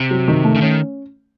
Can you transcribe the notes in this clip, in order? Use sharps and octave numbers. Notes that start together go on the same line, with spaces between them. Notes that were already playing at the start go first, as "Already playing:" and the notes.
Already playing: C3
F#3
D#3
A3
C#3
D#3 C#4